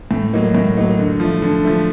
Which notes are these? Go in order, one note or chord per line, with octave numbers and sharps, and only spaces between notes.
A2
F#3 A#3 D#4
A2
F#3 A#3 D#4
D3
F3 A3
D3
F3 A3